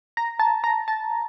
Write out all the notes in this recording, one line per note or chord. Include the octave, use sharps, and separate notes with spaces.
A#5
A5
A#5
A5